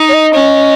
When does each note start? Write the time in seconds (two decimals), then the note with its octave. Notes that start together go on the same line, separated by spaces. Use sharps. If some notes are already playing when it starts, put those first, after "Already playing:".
Already playing: D#4
0.09 C#5
0.13 D#5
0.34 C#4